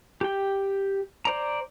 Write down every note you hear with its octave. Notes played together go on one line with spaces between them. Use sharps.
G4 G5
C5 D5 A#5